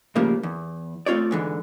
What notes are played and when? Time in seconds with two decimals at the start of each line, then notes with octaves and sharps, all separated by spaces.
0.15 A2 C#3 F3 G3 A#3
0.43 E2
1.06 A3 C4 F4 C#5 D5
1.31 G#2 D3 E3